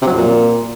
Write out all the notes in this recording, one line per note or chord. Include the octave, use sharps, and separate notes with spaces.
C3
F#3
F2
A#2